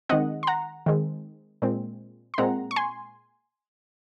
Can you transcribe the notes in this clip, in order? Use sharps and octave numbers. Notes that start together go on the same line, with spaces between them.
D#3 G#3 C4 D#5 F#5
C6
F#5 A#5
D#3 G#3 C4
A#2 G#3 C4
C6
A#2 G#3 C4 F#5 A#5
C#6
G#5 C6